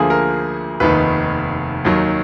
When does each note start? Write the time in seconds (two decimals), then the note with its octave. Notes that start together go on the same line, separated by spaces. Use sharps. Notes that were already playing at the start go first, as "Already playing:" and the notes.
Already playing: D2 D3 F3 A#3 G#4
0.10 A#4
0.80 F1 D#2 D#3 B4
1.85 D#2 D#3 F#3